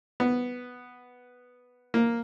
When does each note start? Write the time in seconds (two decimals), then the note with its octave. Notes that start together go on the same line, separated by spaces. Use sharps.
0.20 B3
1.94 A#3